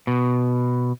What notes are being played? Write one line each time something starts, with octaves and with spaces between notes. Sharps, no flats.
B2